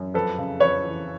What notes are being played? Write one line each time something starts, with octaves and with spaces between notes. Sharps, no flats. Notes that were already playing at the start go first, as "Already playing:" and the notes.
Already playing: F#2
F2 A4 B4
C#3
F2 B4 C#5
E3